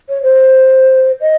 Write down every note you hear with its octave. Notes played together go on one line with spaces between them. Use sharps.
C#5
C5
D#5